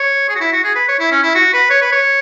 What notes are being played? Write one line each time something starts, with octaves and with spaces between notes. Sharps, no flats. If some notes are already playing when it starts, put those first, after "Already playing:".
Already playing: C#5
G#4
F#4
E4
F#4
G#4
B4
C#5
E4
C#4
E4
F#4
B4
C#5
B4
C#5